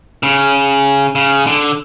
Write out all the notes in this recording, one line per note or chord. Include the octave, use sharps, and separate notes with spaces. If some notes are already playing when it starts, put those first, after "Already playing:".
C#3
C#3
D3